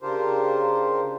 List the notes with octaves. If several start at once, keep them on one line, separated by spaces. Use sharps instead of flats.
C#3 D4 F4 G4 A#4 C5